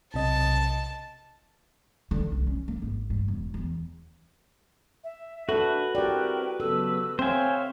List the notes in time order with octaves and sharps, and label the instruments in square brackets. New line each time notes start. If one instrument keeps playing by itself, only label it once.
[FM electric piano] B1 C3 D#5 [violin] A5
[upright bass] D3
C2
C#4
A#3
G#1
G2
E1
E2
[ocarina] E5
[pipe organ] D4 [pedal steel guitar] F#4 B4 [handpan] A4
[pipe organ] C4 E4 A#4 [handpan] G4 D5 [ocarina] G5
[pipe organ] C#3 F#3 B3 [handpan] A4 [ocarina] E6
[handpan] C4 [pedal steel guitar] C5 G#5 [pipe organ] C#5 E5 F5 [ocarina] G5